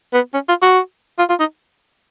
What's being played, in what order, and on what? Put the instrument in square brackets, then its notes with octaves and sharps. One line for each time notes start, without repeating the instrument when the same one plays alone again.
[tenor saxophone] B3
C#4
F4
F#4
F4
F4
D#4